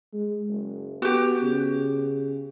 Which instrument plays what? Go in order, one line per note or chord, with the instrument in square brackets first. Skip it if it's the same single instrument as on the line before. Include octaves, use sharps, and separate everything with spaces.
[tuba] G#3
F#1
[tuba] B3 [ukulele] F#4 G4
[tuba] C#3